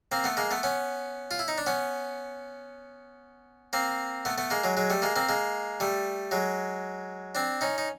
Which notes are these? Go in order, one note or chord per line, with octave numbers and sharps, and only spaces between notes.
A#3 C4
A3 B3
G#3 A#3
A3 B3
B3 C#4
F4
E4
D#4
D4
B3 C#4
A#3 C4
A3 B3
A3 B3
G#3 A#3
F#3 G#3
F#3 G#3
G3 A3
G#3 A#3
A#3 C4
G#3 A#3
G3 A3
F#3 G#3
C4 D4
C#4 D#4
D#4